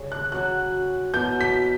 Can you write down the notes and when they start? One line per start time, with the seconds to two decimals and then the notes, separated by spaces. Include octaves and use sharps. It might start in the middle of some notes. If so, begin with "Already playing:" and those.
Already playing: C#3 G3 C#4
0.12 F#6
0.32 F#3 C#4 F#4 F#6
1.13 B2 F#3 B3 E4 G6
1.41 B6